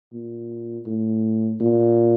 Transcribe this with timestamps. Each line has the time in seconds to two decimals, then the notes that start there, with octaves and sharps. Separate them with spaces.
0.13 A#2
0.86 A2
1.60 A#2